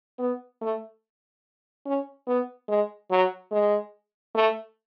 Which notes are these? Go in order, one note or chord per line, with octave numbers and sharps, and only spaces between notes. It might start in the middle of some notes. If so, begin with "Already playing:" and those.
B3
A3
C#4
B3
G#3
F#3
G#3
A3